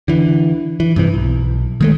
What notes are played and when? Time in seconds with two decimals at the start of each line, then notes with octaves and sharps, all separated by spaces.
0.08 D3 E3
0.80 E3
0.96 G2 C3 E3
1.14 B1
1.81 D#3 G#3 A3